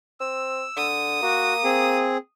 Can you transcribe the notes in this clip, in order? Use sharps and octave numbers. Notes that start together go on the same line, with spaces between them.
C4 E6
D3 D#6
A#3 F#4
C4 G#4